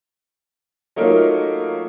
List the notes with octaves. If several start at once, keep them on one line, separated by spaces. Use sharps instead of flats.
F#3 A3 A#3 D#4 F4 A#4